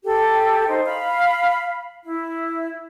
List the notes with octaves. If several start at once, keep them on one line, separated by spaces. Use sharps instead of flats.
G4 A4
D#4 C5
F5 B5
E4